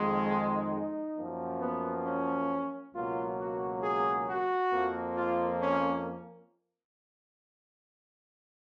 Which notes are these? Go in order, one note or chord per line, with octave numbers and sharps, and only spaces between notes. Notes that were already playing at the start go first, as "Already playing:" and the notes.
Already playing: F2 D#3 G#3
D#4
F#2 F3 A#3
B3
C#4
C#2 B2 F#3 A#3 F4
F#4
G#4
F#4
F2 F3 A#3
F4
C#4